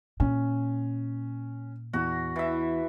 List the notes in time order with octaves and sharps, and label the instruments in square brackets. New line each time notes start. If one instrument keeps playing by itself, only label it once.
[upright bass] A#2 [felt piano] C#4
[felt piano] E2 [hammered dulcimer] F#4
[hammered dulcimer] E3 E5